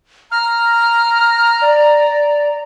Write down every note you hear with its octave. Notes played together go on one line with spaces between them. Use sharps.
A#5 F6
D5